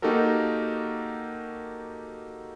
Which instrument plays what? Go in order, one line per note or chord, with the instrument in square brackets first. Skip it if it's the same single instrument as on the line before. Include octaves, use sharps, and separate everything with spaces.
[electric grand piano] A#3 D#4 F#4 G4 A4 A#4